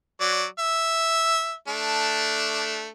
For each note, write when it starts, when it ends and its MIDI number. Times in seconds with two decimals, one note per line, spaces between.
0.21 0.44 54
0.21 0.44 74
0.59 1.55 76
1.68 2.87 57
1.68 2.87 62